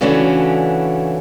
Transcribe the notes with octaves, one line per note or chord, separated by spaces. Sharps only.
C#3 E3 A3 C#4 D4 F#4